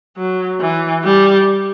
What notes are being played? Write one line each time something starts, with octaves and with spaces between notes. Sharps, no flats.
F#3
E3
G3